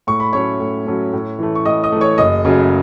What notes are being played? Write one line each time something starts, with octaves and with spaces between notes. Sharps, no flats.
A2 C#6
B5
F#3 A3 C#4 C#5 C#6
A2
F#3 A3 C#4
A2
E3 A3
C#6
A2 D#5 D#6
D#5 D#6
E3 A3
C#5 C#6
F#1 D#5 D#6
F#2 C#3 F#3 A3